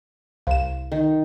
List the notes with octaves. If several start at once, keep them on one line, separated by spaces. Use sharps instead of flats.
C2 F5 E7
D#3